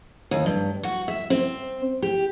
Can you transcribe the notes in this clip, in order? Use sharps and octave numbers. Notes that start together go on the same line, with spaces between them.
D#2
G2
F#4
E5
C4
G4